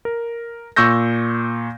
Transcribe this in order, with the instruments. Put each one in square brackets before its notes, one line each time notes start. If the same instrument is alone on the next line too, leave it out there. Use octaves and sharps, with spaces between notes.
[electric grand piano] A#4
A#2 C#6 E6 G6 A#6